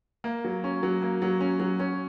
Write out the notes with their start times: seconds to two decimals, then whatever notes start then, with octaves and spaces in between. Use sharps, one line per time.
0.24 A#3
0.45 F#3
0.64 C#4
0.83 F#3
1.02 A#3
1.22 F#3
1.41 C#4
1.60 F#3
1.80 C#4